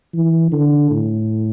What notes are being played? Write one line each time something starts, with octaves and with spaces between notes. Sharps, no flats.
E3
D3
A2